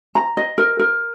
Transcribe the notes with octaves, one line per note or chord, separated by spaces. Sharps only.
A#5
D#5
A#4
A#4